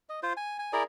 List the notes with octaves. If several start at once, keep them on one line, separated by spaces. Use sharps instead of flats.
D#5
F4 C5
G#5
G#5
E4 G#4 A#4 D5